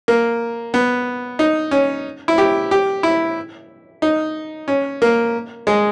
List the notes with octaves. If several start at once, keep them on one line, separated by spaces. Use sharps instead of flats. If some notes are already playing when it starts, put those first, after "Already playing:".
A#3
B3
D#4
C#4
E4
G4
G4
E4
D#4
C#4
A#3
G#3